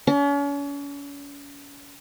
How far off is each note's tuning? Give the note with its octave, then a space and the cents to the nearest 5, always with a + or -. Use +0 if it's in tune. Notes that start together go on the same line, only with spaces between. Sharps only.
C#4 +40